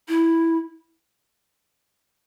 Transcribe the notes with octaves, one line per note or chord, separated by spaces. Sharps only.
E4